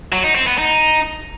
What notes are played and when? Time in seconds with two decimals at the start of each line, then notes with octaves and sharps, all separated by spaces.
0.13 F#3
0.24 D#4
0.35 C4
0.47 B3
0.58 D#4